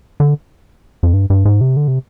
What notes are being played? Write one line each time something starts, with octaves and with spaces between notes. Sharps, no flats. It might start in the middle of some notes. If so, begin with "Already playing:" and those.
D3
F2
G2
G2
G#2
C3
D3
C3